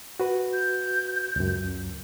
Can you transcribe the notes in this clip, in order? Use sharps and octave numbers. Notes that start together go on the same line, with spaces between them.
F#4 B4
G6
C#2 F#2